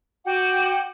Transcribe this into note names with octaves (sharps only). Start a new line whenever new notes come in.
F#4 F#5 G5 D6